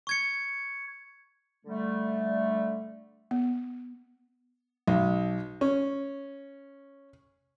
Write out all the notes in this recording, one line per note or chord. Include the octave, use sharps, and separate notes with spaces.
C#6 G#6 C#7
D3 G3 A3
B3
B1
C#4